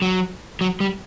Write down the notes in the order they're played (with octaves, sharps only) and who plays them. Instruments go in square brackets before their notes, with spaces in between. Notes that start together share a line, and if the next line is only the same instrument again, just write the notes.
[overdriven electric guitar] F#3
F#3
G3